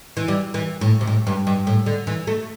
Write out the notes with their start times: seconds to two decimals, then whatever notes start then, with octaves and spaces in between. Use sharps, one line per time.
0.17 E3
0.28 G3
0.54 E3
0.81 A2
1.01 C3
1.07 A2
1.27 G2
1.47 G2
1.67 A2
1.86 D3
2.07 E3
2.27 A3